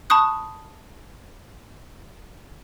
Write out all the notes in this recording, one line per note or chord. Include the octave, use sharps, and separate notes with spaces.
A5 B5 C#6 D#6 F#6